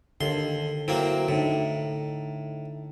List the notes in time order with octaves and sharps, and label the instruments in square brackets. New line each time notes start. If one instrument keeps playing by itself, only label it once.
[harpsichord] D#2 C6 [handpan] D3 A4
[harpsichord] F#3 A#3 C4 [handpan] E4
[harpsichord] A2 [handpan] D3 D#4